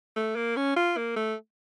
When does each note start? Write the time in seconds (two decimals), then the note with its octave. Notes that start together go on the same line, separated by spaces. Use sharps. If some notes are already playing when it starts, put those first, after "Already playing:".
0.16 A3
0.36 A#3
0.57 C#4
0.76 F4
0.97 A#3
1.16 A3